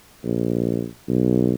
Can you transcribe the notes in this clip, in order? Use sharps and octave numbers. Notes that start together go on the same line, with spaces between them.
A#1
B1